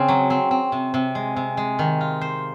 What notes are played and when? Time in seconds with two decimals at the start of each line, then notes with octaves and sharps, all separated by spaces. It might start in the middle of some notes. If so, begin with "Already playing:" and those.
Already playing: C#3 C4
0.08 F#3
0.30 C4
0.51 C4
0.72 C3
0.94 C3
1.15 G#3
1.37 C3
1.57 G#3
1.79 D#3
2.01 F4
2.21 C5